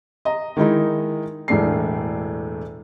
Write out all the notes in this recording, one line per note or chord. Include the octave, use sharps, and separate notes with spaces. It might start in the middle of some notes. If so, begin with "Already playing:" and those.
D#5 A#5
D#3 G#3 D#4 E4
E1 A2 A3 D4 C7